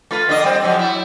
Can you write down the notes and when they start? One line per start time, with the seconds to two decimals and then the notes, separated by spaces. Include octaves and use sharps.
0.11 A3 F4 B4
0.29 D3 A#3 D#5
0.44 G3 C4
0.64 F3 F#3 G#3
0.79 F#3 E4